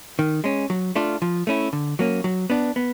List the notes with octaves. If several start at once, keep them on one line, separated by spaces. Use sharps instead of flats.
D#3
G#3 C#4
F#3
A3 D4 F4
F3
A3 C#4 E4
D3
F#3 A#3 C#4
F#3
B3 D4
B3